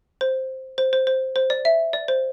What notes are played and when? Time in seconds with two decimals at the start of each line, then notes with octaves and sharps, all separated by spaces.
0.21 C5
0.78 C5
0.93 C5
1.07 C5
1.36 C5
1.50 D5
1.65 E5
1.93 D5
2.08 C5